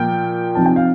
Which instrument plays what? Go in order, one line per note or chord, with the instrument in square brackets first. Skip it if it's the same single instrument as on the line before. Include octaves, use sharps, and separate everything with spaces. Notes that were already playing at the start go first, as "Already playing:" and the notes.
Already playing: [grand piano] A#2 F3 A#3 G5
C3 F3 C4 D#4 A5
G5
F5